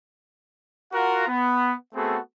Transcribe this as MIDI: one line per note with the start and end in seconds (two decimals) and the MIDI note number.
0.93 1.24 65
0.93 1.24 66
0.93 1.24 70
0.93 1.24 77
0.93 1.24 78
0.93 1.24 82
1.28 1.73 59
1.94 2.17 57
1.94 2.17 59
1.94 2.17 60
1.94 2.17 66
1.94 2.17 68
1.94 2.17 69